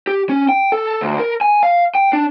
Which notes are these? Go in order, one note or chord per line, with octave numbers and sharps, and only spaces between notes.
G4
C#4
G5
A4
D2
A#4
G#5
F5
G5
D4